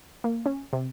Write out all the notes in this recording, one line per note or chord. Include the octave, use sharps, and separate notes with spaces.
A#3
C#4
C3